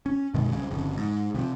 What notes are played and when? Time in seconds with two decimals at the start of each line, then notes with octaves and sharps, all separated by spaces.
0.06 C#4
0.34 F#2 B2 D#3 G#3
0.52 C2 C#3
0.71 G1 F2 C#3
0.97 G#2
1.34 C3 E3 F3